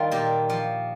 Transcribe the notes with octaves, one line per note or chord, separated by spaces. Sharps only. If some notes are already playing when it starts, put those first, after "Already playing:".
Already playing: D#3 G3 F4 A#4
A#2 G4
F3